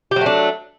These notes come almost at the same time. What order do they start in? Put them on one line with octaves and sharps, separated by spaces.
G4 F#3 A3 D4